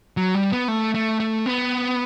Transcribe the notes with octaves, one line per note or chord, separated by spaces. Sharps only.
F#3
G3
B3
A3
A3
A3
B3